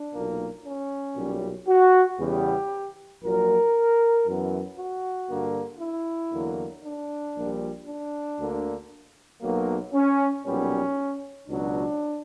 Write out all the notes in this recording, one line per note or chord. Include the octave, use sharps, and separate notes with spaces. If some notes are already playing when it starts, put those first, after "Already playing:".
Already playing: D4
B1 A#2 A#3
C#4
B1 A#2 G3
F#4
E2 C#3 G3 B3 G4
A#1 A#2 F#3 A#4
F#2 E3 B3
F#4
G2 D3 A#3
E4
E2 D3 F#3 A#3
D4
A#1 A#2 G3
D4
D2 D3 A#3
B1 B2 F#3 A#3
C#4
B1 A#2 G3 B3 C#4
C#2 B2 F#3 D4